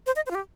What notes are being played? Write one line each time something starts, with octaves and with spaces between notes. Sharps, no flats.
C5
D#5
C5
F4
G4